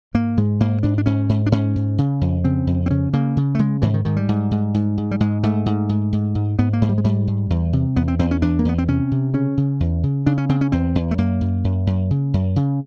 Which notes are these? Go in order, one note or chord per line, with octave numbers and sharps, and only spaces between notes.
G#2 A#3
G#2 G#3
G#2 A#3
G#2 D4
D4
G#2 C#4
G#2
D4
G#2 C#4
G#2
C#3
F2
C#3 C4
F2
C4
C#3 C#4
C#3 A#3
C#3
A3
C#3 G#3
G#2 E3
D#3
G#2 D#3
G3
G#2
G#2
G#2
G#2
G3
G#2 G#3
G#2 A3
G#2
G#2
G#2
G#2
G#2 B3
A#3
G#2 G#3
G3
G#3
G#2 G3
G#2
E2
C3
E2 B3
C4
E2 C4
C#4
E2 D4
A#3
E2 B3
C4
C3 C#4
C3
C#3 C#4
C#3
E2
C#3
C#3 D4
C#4
C#3 C4
C#4
E2 C4
E2
A3
F#2 A#3
F#2
F#2
F#2
C#3
F#2
C#3